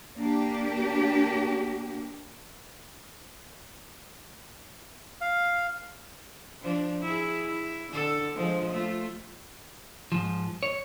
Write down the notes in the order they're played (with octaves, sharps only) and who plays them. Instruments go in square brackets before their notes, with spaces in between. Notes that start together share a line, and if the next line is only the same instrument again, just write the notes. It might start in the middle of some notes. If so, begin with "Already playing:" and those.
[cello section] A#3 D4 G4
[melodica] F5
[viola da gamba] F3 D4
E4 G#4
E4
D3 D4 A4
F3 G#3
A3 F4
[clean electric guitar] G#2 F3
C#5